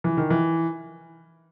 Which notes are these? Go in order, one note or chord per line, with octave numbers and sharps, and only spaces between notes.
E3
D#3
E3